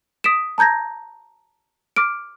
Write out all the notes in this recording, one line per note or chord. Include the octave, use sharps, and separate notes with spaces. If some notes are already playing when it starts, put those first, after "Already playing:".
D#6 B6 D7 E7
A5 A#5 G6 G#6 A#6
D6 F6 D7